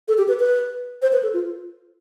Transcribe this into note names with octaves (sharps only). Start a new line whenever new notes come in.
A4
G4
B4
B4
C5
B4
A4
F4